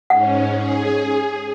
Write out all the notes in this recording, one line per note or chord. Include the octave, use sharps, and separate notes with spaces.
G#2 C#4 F#5
G#4